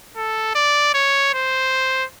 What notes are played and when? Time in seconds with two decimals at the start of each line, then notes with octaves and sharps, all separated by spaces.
0.17 A4
0.55 D5
0.94 C#5
1.34 C5